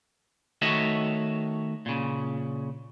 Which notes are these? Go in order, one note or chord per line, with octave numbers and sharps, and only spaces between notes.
D#3 A3 F#4 C#5 D#5 E5
A#2 C#3